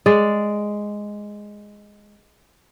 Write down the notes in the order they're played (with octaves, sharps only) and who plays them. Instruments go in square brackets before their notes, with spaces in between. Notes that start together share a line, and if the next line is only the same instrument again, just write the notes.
[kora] G#3 D5